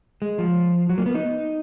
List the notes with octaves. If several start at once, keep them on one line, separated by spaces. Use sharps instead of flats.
G#3
F3
F#3
A#3
B3
D#4